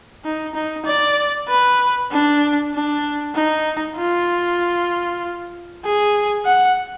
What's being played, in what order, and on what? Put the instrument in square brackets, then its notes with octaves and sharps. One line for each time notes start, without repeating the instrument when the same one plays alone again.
[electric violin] D#4
D#4
D5
B4
D4
D4
D#4
F4
G#4
F#5